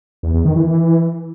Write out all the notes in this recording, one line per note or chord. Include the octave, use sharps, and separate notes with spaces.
E2
E2
D#3
E3